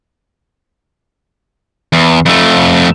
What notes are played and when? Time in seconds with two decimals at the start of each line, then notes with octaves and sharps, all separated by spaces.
1.93 E2
2.26 F2 A3